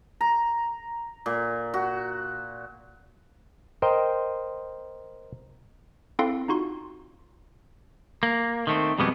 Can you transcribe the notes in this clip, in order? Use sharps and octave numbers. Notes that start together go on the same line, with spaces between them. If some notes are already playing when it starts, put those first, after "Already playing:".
A#5
A#2
F#4
A#4 C5 D#5 G5
C4 E4 A4 F5 C6 D7
D#4 F4 F#4 C6
A#3
D#3 A3 C4
F2 B2 G3 G#3 B3 C4